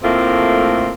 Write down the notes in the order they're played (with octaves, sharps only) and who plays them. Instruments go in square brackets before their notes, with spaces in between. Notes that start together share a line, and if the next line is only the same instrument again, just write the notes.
[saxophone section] A2 A3 A#3 C4 F4